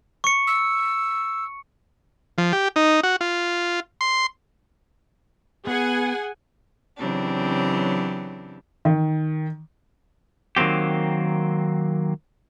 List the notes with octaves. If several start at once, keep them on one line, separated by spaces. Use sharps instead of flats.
C#6 C#7
E6
F3
G4
D#4
F#4
F4
C6
B3 G#4 F#5 G#5
C#3 E3 F#3 C4 D4 G4
D#3
D#3 F#3 A#3 C4 G4